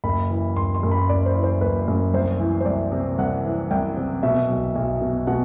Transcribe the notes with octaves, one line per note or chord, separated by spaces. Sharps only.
F#1 B5
E3
F#1 C6
C6
F#2
B5
F#1 D5
C5
E3
C5
F#1 B4
F#2
C2 C5
E3
C5
C2 D5
C3
C2 F#5
E3
C2 G5
C3
B2 E5
B1
B1
B2
B2 F#5